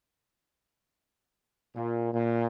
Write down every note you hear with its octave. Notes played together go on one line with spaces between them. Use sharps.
A#2
A#2